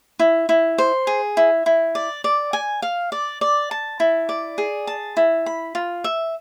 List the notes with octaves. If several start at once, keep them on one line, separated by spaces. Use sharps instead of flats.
E4
E4
C5
G#4
E4
E4
D5
D5
G#5
F5
D5
D5
A5
E4
D5
G#4
A5
E4
B5
F4
E5